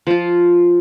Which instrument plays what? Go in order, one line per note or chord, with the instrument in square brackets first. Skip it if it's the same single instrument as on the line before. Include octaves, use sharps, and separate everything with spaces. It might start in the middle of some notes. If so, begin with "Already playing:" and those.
[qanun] F3 F4